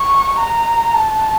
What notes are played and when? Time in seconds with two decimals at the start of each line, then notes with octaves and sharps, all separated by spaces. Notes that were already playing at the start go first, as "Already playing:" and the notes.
Already playing: C#6
0.39 A#5
0.94 A5